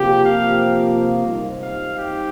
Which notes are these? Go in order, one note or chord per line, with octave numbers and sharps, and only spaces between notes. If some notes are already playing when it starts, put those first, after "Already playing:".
Already playing: C3 F3 A#3 F4 G4
F5
G3 C4 D#4
F5
G4